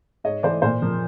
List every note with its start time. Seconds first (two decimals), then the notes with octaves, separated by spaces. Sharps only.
0.24 G#2 C#5 D#5
0.43 E3 A3 C5 D5
0.62 A#2 C5 D5
0.82 F3 A#3